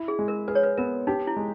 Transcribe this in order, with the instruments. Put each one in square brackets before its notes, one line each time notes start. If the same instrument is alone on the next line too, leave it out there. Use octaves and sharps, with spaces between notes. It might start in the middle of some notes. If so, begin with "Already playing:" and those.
Already playing: [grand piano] E4
[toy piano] G#4
[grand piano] G#3
[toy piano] A#4
[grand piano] G#4 [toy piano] B4
[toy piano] C#5
B4
[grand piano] B3 [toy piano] A#4
[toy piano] D#4 [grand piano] G4
[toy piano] E4
[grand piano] G#3